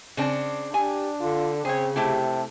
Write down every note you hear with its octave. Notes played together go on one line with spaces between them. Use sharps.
C#3 C4 D4
D4 G4 G#5
D3 F4
C#3 C4 G#4 C#5
C3 A3 E4 G4 A5